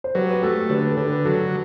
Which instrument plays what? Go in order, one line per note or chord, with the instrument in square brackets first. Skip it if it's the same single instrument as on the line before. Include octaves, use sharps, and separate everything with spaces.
[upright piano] C5
[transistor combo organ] F#3 [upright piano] G4 B4
[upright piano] G4
[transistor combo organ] A3 [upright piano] F#4 A4
[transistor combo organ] D3 [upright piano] G4 B4
[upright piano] A4
[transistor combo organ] D3 [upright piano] G4 B4
[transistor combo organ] F#3 [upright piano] F#4 A4